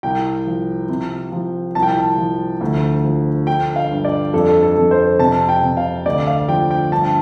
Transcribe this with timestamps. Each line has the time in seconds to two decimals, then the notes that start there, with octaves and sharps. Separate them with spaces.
0.03 C2 G5
0.47 F3
0.89 C3
1.32 F3
1.75 C2 A5
1.83 G5
1.90 A5
2.18 F3
2.61 D2
3.04 F3
3.47 D3 G5
3.76 F5
3.91 G2
4.05 D5
4.34 F2 A4
4.62 A4
4.77 F2
4.91 C5
5.19 C3 A5
5.49 G5
5.63 C3
5.77 F5
6.06 D2 D5
6.27 F5
6.49 F3 G5
6.71 G5
6.91 G2 A5